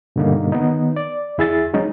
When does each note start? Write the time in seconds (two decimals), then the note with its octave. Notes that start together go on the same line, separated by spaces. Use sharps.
0.16 G2 B2 D3 G3 A#3 D#4
0.52 D#3 B3 D#4
0.96 D5
1.38 E2 E4 G#4 E5 A6
1.73 F#3 G#3 C#4 D#4